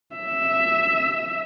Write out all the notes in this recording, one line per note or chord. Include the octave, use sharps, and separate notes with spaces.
E5